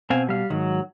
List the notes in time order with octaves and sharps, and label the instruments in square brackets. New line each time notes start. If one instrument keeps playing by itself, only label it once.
[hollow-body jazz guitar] B2 [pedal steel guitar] C4 F5 G#5
[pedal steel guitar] G3 F5
[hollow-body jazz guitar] G#2 D#3 [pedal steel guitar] F#3